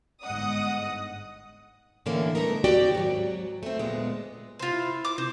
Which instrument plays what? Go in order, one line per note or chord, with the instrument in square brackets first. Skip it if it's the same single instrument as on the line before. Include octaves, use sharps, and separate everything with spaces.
[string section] G1 G#2 D#5 F#5 D#6
[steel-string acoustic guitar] A2 D3 E3 A#3 C#4 E4
G3 A3 B3 D#4 A#4
D#2 C4 F#4 G4 D5 G5
G#2 F#3
A3 C4
D2 A#2 G#3 B3
[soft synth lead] C3 [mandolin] F4 C5
[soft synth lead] E4
[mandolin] D6
[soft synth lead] C3 [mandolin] C5